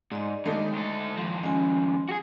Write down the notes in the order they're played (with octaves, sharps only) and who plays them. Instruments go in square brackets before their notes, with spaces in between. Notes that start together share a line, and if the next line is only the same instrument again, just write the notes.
[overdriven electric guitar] G#2 [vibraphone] D5 D#5
[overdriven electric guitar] D#2 [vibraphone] G#3 A5 [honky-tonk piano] A3 D#4
[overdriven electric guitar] D2 A4
D#2 F3
[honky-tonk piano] G#3 [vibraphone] C#4 G#5
[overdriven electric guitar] F#4 G#4